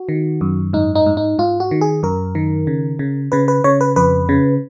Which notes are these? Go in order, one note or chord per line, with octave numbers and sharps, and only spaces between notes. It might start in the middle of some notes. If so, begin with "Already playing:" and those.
Already playing: F#4
D#3
F#2
G#2 D#4
D#4
G#2
D#4
G#2 F4
F#4
D#3
G#4
F#2 A#4
D#3
C#3
C#3
C#3 B4
B4
C#3 C#5
B4
F2 B4
C#3